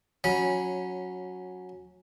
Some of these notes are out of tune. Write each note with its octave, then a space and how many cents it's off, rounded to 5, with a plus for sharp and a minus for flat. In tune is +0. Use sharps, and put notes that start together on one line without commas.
F#3 -15 C#4 +0 B5 -25